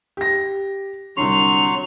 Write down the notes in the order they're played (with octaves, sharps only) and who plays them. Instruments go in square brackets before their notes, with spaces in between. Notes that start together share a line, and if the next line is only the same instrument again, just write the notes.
[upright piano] G4 A#6
[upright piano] C2 D3 [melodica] F#3 C6 C#6 [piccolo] F7